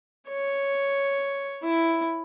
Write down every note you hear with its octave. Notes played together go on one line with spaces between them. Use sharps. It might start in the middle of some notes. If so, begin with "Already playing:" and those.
C#5
E4